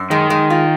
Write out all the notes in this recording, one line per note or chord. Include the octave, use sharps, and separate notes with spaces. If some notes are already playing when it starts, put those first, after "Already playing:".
Already playing: F#2
D#3 G#3
G#3
F4